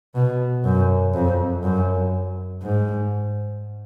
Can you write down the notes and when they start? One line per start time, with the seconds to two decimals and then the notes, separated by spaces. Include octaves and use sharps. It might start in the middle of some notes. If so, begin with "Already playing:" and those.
0.15 B2
0.65 F#2
1.14 F2
1.63 F#2
2.62 G#2